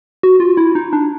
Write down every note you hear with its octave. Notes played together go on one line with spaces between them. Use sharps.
F#4
F4
E4
D#4
D4